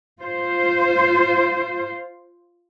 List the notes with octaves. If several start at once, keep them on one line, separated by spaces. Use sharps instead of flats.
F4 C5